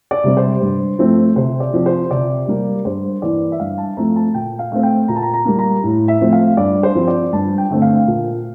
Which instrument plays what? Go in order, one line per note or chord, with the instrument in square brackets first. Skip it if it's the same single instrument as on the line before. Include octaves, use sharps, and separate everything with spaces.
[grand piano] D5
C3 G3 C4
C5
G2
F3 A3 C4
C3 C5
D5
F3 C4
C5
C3 D5
G3 A#3
G2 C5
E3 A#3 D5
E5
G2 F5
A5
F3 A3 C4 A#5
A5
A#2 G5
F5
A3 C4
G5
A#2 A#5
A5
A#5
A#5
G3 A#3
A#5
A2
E5
F3 A3 C4
F5
G2 D5
C5
F3 C4
D5
G2 A5
G5
D3 A3 C4
F5
A#2